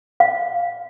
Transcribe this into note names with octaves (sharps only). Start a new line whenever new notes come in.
F5